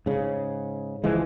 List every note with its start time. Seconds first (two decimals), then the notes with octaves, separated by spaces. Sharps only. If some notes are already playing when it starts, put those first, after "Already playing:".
0.06 G#2 C#3
1.04 C#2 E3 F3 G#3